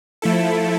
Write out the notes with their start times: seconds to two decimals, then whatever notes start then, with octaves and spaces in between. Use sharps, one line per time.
0.22 F3 A3 E4 A4